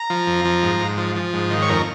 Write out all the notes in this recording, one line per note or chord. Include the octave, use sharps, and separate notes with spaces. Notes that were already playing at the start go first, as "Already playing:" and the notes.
Already playing: A#5
F3
F2
F3
G#2
G#2
F3
F3
G#2
D#3
C#5
F2 A#4